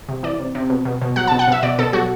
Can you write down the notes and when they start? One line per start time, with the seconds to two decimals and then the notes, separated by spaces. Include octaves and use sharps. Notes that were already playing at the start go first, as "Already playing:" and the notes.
0.08 C3
0.23 E3 D5
0.40 C3
0.55 C3
0.70 B2
0.85 B2
1.02 B2
1.16 F#3 F#5
1.27 A5
1.32 B2
1.39 F#5
1.48 B2 E5
1.63 B2 D5
1.78 B2 A4
1.93 F#3 F#4